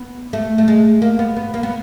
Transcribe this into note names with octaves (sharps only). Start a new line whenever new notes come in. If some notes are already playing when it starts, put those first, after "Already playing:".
Already playing: B3
A3
A3
G#3
A#3
B3
B3
A#3
B3